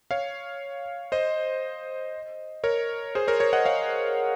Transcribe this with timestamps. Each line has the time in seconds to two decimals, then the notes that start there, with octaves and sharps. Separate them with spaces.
0.11 C#5 F5
1.12 C5 D#5
2.64 A#4 C#5
3.15 G#4 C5
3.27 A#4 C#5
3.40 A#4 C#5
3.53 D#5 F#5
3.66 C#5 F5